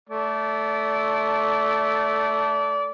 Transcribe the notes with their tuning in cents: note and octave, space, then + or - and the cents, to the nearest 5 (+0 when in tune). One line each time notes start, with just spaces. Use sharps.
A3 -5 D5 -25